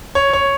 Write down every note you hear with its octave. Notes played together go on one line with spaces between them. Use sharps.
C#5
C#5